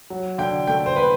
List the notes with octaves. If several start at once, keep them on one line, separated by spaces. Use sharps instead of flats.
F#3
D3 G5
A3 G5
C5
D3 B4